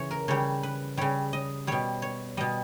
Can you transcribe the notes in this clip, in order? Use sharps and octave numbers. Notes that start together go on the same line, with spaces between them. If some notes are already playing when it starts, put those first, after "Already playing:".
Already playing: C#3 E3 C#5
A#4
C#3 G3 C#5
B4
C#3 G3 C#5
D#5
B2 G3 C#5
C#5
B2 G3 D#5